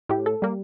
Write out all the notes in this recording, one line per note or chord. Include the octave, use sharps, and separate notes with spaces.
A2 G4
A4
G3 A#3